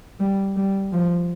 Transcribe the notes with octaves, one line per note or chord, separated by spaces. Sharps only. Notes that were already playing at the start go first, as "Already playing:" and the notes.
G3
G3
F3